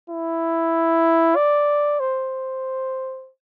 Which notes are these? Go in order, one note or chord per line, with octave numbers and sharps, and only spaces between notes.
E4
D5
C5